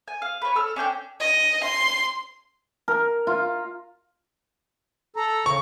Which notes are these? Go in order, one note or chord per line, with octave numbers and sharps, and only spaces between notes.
G#5
F5
B4 C#5
A4 E6 F6
C#4 D4 G5 G6
D#5
C6
A#4
F4
A4 A#5
C#3 C#6